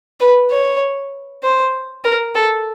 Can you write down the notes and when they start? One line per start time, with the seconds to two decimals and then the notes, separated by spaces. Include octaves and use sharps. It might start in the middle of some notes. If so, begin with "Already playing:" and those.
0.20 B4
0.51 C#5
1.43 C5
2.04 A#4
2.35 A4